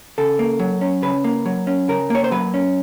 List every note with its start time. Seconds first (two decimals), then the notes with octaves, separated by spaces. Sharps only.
0.18 C#3 A4
0.39 A#3
0.60 F#3
0.81 C#4
1.02 C#3 B4
1.24 A#3
1.46 F#3
1.67 C#4
1.89 C#3 A#4
2.10 A#3 C#5
2.24 C5
2.31 F#3 B4
2.54 C#4